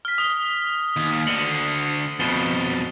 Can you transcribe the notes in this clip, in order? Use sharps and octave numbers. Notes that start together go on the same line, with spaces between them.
F6 B6
D#6 F6 G7
D#2
D2 D3 C#7 F#7 G7
C7
F2 B2 A6 G7